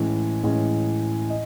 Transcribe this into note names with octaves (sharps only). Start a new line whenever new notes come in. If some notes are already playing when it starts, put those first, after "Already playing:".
Already playing: A2 E3 G#3 C#4
A2 E3 G#3 C#4
D#5